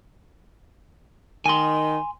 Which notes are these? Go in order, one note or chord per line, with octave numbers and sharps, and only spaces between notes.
D#3 G#5 C6